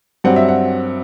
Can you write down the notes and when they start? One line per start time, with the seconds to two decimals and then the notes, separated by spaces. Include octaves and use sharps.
0.24 G2 F#3 C4 F#5
0.36 E5
0.49 F#5